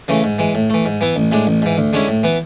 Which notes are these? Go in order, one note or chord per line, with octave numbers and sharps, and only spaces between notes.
C#3 E3 A3
G#2
E3 G#3
A2
E3 A3
G#2
E3 B3 E4
A1
A2 G#3 D4
A1
G#2 E3
D2
D3 G#3 C#4 E4
A2
E3 B3